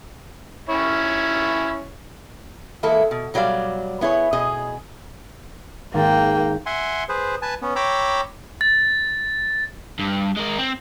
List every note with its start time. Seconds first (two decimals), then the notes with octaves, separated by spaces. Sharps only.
0.69 C#4 E4 C#5
2.83 E3 G#3 A#3 E4 A4
3.11 B2
3.34 B2 F#3 G3 D5 F5
4.01 B3 E4 G#4 C#5
4.33 B2 G#4 D#5
5.94 G#1 A#3 G5 A6
6.66 E5 F#5 G#5 C6
7.09 G#4 B4 C5
7.42 B4 G#5 A5
7.62 B3 C#4
7.76 C#5 G5 A#5 B5 D6 E6
8.61 A6
10.00 G2
10.37 G#3 A#4
10.58 C4